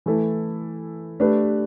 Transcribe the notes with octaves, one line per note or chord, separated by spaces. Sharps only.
E3 A3 E4 A4
A3 D4 G4 B4